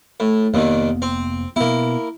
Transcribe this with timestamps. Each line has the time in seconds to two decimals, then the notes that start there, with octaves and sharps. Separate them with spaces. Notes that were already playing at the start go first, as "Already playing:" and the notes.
0.20 A2
0.54 F1 D#2 A#2 D#3 A#3 B3
1.02 C4
1.56 B2 A#3 B3 E4